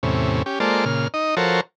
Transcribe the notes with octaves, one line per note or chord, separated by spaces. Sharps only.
E2 A2 C3 C#4
C#4 G4
G#3 A#3 F4 A4 C5 D5
A#2 C#3 F6
D#4 D#5
F3 F#4 A4 A#4 C5 C#5